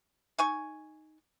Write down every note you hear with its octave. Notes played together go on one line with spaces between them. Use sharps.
D#4 G#5 C#6